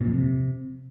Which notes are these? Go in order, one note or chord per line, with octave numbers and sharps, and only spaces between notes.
A#2
F2
C3